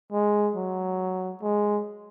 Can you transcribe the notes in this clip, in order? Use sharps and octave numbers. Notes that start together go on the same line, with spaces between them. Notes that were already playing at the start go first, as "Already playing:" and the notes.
G#3
F#3
G#3